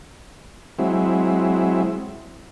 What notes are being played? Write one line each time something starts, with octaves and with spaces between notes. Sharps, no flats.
F#3 G#3 C4 E4